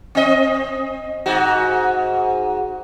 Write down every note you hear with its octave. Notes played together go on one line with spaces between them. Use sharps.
C4 D#5
G#2 F#4